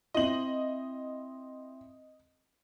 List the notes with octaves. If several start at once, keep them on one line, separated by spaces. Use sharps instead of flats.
C4 E4 D#5 F#7